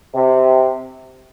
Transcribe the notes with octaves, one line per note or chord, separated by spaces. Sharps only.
C3